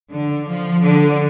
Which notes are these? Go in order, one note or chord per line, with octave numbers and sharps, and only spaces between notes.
D3
F3
D3